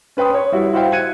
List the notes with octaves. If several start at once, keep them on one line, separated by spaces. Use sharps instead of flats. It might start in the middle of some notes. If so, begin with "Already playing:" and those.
C#4 B4 G5 C6 D#6
C#5
G3 E4 F#4
E4 F#4 C5 D#5 F5 G5
F#6 G#6 C#7 D#7